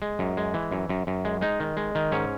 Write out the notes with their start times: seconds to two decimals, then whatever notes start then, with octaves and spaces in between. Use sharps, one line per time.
0.02 G#3
0.19 F#2
0.37 G#3
0.54 E3
0.71 F#2
0.89 F#2
1.07 F#2
1.25 G#3
1.41 G#3 D#4
1.60 D#3
1.77 G#3
1.95 D#3
2.12 G#2 C#4